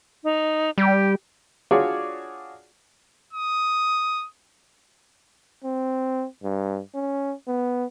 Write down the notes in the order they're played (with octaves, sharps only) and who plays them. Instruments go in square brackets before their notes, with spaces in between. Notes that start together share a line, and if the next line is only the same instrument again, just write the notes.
[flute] D#4
[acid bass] G3 [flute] G4
[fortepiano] D4 F4 F#4 G#4 C#5 D5
[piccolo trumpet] D#6
[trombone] C4
G2
C#4
B3